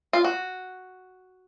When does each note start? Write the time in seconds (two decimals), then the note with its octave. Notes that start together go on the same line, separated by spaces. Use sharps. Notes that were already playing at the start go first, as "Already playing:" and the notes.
0.13 F4
0.24 F#4